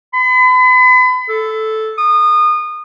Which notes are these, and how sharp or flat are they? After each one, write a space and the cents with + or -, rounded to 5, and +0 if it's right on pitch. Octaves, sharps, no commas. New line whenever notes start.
B5 +40
A4 -5
D#6 -25